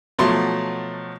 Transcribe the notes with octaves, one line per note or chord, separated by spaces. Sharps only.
B2 F3 F#3 A3 C6